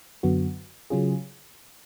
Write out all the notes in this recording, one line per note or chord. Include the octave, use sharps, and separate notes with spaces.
F#2 D3 F#3 B3 F#4
C#3 F#3 C#4 F4 G#4